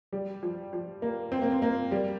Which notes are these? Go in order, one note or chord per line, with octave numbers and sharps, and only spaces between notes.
G3
F3
F3
A#3
C4
A#3
C4
A#3
G3